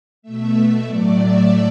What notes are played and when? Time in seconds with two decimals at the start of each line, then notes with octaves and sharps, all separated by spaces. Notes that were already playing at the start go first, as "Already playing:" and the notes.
0.22 B2 A3 E5
0.85 A2 F#3 A3 D5
1.17 E5